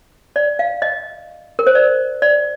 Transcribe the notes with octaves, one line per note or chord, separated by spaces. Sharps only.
D5
F5
D#5
A#4
C5
D5
D5